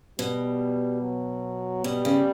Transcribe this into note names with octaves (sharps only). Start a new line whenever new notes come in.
B2 G3
F#3
B2 G3
C#3